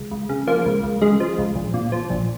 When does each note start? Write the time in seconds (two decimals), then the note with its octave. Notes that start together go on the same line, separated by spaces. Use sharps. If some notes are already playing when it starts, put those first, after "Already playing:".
Already playing: C#2
0.11 C#2
0.29 C#3
0.47 F3 A#3
0.66 C#2
0.83 C#2
1.02 C#3 G#3
1.20 F3
1.38 C#2
1.55 A#1
1.74 A#2
1.92 F3
2.10 A#1